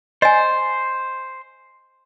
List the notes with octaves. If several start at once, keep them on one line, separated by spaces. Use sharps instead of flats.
C5 D#5 G#5